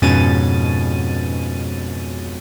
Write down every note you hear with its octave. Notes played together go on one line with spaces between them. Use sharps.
F2 G#2 B2 C#4 A6 D#7